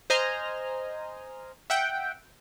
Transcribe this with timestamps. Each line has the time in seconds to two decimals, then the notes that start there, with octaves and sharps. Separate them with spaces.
0.10 C5 D#5 G#5 A#5 F6
1.70 E5 F#5 G5